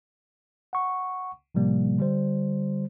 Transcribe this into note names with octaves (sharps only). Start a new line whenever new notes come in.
F#5 C#6
A2 C3 F3 G3 A#3
D3 G3 C5